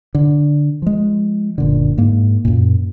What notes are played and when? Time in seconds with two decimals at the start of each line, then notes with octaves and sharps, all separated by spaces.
0.15 D3
0.82 F3 G#3
1.58 F#1 A#2 D3
1.98 G#2 A#3
2.45 F#2 A#2